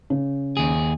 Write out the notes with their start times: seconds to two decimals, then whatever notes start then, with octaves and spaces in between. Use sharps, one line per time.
0.10 C#3
0.57 D#2 G#4